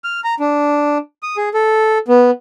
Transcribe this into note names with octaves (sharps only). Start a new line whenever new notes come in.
F6
A#5
D4
D#6
G#4
A4
B3